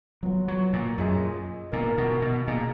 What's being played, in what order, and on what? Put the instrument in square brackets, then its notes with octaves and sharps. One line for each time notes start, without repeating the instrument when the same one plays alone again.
[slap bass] F#3 [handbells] B3 F4 B4 F#5
[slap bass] F#3
A#2
[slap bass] F#2 [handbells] F4 G#4 D#5 G#5
[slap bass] A#2 [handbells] B3 D#4 A#4
[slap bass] B2
B2
[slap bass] A#2 [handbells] D#4 G#4 D#5